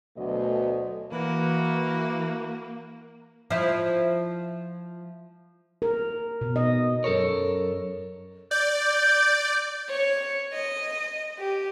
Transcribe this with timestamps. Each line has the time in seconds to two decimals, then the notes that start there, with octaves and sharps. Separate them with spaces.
0.17 D2 B2 F#3 A3 D#5
1.12 E3 A#3 E4 F#4
3.50 F3 E4
5.82 A#4
6.41 B2
6.56 D#5
7.04 F#2 A4 A#4 C#5
8.51 D5 G6
9.89 C#5
10.53 D#5
11.38 G4